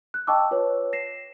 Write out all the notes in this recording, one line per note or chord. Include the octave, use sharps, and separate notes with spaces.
F#6
D#5 G5 A5 C#6 D6 E6
F4 B4 C#5
A#6 C7 E7